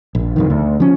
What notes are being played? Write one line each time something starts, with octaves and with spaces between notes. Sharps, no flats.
A#1
F#1 F2 D#3
D2
F3 C#4